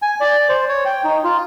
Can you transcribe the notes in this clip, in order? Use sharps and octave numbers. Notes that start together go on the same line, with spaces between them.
G#5
D5
C5
C#5
G5
D#4
F4